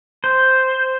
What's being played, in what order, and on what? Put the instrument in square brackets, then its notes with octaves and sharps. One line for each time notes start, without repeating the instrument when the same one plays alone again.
[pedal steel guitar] C5